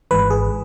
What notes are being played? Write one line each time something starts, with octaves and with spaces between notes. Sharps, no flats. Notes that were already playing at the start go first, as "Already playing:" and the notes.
G#1 G#2 E3 B4
G#4